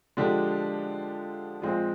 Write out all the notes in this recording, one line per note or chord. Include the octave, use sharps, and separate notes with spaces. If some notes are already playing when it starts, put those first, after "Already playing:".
D3 F3 G#3 D4 G4
A#2 F3 G#3 C4